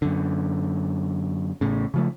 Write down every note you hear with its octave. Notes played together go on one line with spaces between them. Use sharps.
F#2 D3
A1 A2 C#3
C#3 F3 A3